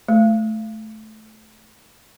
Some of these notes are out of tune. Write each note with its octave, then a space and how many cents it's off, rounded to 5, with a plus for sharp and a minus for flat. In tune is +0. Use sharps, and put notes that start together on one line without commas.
A3 -15